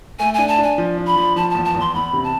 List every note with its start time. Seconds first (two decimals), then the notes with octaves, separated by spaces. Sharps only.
0.19 A3 G#5
0.34 D4 G#5
0.48 A5
0.58 D4 G#5
0.78 F3
0.97 D4
1.07 B5
1.16 F3
1.36 F3 A5
1.50 E2 A5
1.65 A5
1.75 E2
1.80 C6
1.94 E2 B5
2.13 C3
2.24 A5